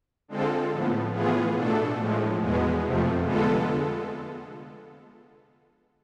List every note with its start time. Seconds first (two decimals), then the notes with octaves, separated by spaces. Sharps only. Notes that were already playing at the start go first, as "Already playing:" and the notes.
0.28 D3 G#3 C4 F4 A4
0.71 A2 F3 B3
1.13 A2 E3 B3 F4 G#4
1.56 B2 A3 D4 A4
1.99 A2 F3 G#3
2.41 E2 B2 G#3 B3
2.84 F2 C3 F3 A3
3.26 D3 G#3 B3 F4 A4